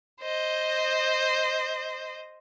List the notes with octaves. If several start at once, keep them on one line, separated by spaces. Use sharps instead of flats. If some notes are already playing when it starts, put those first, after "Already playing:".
C5 D#5